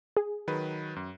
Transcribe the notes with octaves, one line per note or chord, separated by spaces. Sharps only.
G#4
D#3 F#3 B4
F#2